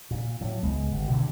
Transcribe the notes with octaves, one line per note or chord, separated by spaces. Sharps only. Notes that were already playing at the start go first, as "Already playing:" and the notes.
A#2
A2 F#3
C#2 G#3 B3
G1
B2 D3 E3 A#3